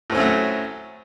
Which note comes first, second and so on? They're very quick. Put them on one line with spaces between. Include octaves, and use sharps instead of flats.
A2 C4 C#4 A3 F#3